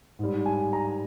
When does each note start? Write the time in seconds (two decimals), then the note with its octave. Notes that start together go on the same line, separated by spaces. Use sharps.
0.19 G#2 G3
0.46 G#5
0.73 A#5